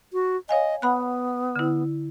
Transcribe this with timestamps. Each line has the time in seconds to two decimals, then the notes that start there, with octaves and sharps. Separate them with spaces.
0.13 F#4
0.49 C#5 D#5 F5 G#5
0.82 B3 F#5 B5 F#6
1.56 D3 E4